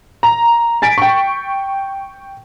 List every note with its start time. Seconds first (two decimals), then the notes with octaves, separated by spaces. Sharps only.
0.23 A#5
0.82 G#5 A6 B6 D7
0.98 G5 C#6